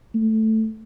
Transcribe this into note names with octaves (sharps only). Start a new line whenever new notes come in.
A3